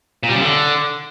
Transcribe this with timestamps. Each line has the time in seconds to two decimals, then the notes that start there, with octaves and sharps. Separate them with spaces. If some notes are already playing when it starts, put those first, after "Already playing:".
0.23 A#2
0.29 G3
0.35 C#3
0.41 D3